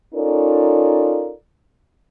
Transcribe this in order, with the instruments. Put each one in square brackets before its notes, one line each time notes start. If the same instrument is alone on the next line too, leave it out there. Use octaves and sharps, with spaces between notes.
[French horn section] C#4 D#4 F4 A4 A#4 D5